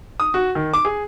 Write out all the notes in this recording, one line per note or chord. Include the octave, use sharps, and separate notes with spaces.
D#6
F#4
D#3
D6
G#4